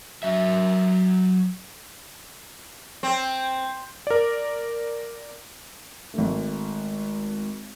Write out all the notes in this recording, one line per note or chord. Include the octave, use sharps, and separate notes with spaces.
F#3 E5
C4
A#4 D5
G#1 A3